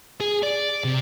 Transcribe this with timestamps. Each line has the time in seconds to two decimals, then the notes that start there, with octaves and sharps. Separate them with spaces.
0.20 G#4
0.43 D5
0.84 C3